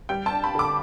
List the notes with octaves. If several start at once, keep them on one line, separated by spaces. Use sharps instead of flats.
G3 G5
A5
D4
B5
D3 D6